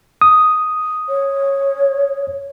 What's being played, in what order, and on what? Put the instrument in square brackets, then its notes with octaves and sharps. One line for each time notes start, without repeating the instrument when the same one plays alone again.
[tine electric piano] D#6
[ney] C#5